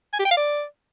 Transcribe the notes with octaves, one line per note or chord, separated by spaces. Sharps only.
G#5
G4
G5
F5
D5